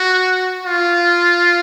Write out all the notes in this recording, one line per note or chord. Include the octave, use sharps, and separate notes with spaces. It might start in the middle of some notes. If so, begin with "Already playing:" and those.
Already playing: F#4
F4